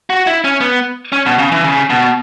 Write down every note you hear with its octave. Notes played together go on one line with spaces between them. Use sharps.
F#4
E4
C#4
B3
C#4
B2
C#3
E3
C#3
B2